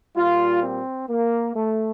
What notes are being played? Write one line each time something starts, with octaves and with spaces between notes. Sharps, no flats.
A#2 G3 F4
C4
A#3
A3